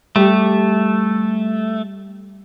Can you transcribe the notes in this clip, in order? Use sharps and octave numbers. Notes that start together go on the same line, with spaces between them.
G3 A3 G4